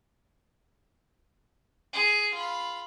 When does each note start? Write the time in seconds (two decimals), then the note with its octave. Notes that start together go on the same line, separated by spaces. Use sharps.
1.93 G#4
2.34 F4 B5